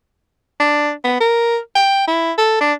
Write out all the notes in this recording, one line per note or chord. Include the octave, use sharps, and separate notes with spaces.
D4
B3
A#4
G5
E4
A4
D4